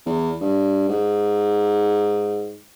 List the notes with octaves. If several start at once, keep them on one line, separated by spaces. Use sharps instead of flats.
E2
G2
G#2